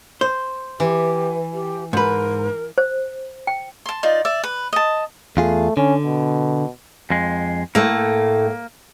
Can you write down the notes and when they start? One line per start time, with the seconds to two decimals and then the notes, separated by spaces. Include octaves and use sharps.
0.21 C5
0.80 E3 G4
1.53 G4
1.93 G#2 A#4 B4
2.78 C5
3.47 G5
3.86 A5 C6
4.03 D#4 F4 D5
4.25 D5 E5
4.44 B4
4.73 D#5 A5
5.37 E2 A3 F4 G#4
5.77 D3 C#4
6.05 B2
7.10 F2 G#3
7.75 A2 A3 A#3